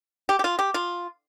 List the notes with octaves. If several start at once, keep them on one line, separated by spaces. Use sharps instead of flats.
G4
G4
F4
G4
F4